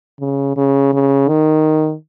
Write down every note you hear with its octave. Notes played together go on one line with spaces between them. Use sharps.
C#3
C#3
C#3
D#3